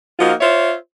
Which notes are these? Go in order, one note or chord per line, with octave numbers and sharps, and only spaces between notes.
F3 A#3 D#4 F4 F#4
F4 C5 C#5 E5